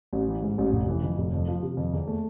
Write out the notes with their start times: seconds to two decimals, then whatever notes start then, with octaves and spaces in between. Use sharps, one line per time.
0.13 A1
0.28 E3
0.42 G#2
0.58 A1
0.72 F1
0.88 E3
1.03 F2
1.18 F1
1.33 F2
1.48 F3
1.63 C3
1.77 F2
1.93 E2
2.07 A3